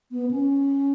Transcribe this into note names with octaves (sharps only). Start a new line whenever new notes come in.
B3
C#4